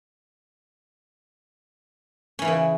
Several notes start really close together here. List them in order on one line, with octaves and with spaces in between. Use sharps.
C#4 E3 E4 C#3